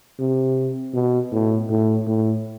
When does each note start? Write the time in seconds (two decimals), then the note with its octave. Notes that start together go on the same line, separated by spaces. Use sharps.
0.19 C3
0.94 B2
1.32 A2
1.70 A2
2.07 A2